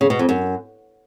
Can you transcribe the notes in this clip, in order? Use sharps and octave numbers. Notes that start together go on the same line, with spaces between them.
C#3
B2
F2
F#2